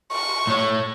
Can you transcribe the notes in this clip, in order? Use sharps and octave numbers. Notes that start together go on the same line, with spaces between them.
C#6
A2 C#5